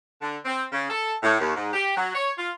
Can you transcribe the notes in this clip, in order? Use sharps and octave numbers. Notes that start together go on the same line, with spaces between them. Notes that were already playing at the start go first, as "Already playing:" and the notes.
D3
C4
C#3
A4
A2
D#2
G#2
G4
F#3
C#5
F4